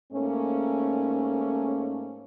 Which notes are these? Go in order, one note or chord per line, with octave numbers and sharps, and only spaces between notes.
G#2 A3 A#3 C#4